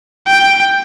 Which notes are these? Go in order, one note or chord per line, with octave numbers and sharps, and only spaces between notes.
G5